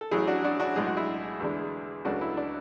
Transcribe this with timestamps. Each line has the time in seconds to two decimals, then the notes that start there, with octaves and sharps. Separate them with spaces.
0.01 A4
0.11 A1 A2 F#3 E4 G#4
0.27 D4 F#4
0.44 D4 F#4
0.60 D4 F#4
0.76 B1 A2 G#3 D4 G#4
0.87 F#4
0.97 E4 G#4
1.40 E2 D3 G#3 D4
2.05 C#2 C#3 F#3 A3 D4 F#4
2.21 E4
2.37 D4